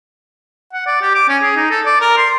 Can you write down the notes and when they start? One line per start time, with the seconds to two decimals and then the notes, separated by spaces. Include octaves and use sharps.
0.73 F#5
0.87 D5
1.02 G4
1.15 D6
1.29 C#4
1.43 G#4
1.56 D#4
1.71 A4
1.86 D5
2.01 A#4
2.17 C6